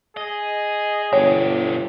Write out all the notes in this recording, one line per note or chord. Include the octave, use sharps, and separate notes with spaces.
G#4 D#5
G1 B2 G4 C#5